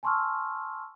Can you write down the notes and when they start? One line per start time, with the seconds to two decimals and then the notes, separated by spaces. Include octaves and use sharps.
0.03 G#5 A5 C6 C#6 E6 F6